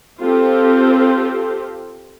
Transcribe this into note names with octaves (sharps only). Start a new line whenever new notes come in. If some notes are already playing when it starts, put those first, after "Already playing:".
C4 F4 G4 A4 C5